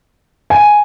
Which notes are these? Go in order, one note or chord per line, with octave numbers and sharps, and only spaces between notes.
G#5